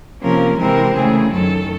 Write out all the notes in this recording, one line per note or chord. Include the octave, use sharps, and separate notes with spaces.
C3 F3 A#3 C#4 A#4
C3 E3 G#3 C4 A#4
C#3 E3 A3 G#4
F#2 D#3 F#3 A4